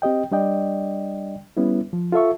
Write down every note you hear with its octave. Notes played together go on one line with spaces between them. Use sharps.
C4 G4 D#5 G5
G3 D4 D5 D#5 G5
G3 B3 C#4 E4
F3
F4 A4 E5 C#6